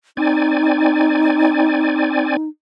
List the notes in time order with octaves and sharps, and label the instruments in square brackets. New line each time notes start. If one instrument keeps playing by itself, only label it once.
[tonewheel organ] C4 D5 G#5 [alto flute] D#4